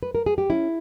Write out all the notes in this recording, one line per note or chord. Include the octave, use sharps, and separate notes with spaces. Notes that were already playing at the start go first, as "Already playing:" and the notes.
B4
A#4
G#4
G4
C#4 E4